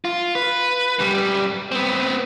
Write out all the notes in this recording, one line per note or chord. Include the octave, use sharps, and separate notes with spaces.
F4
B4
F#2 G3
B3 C4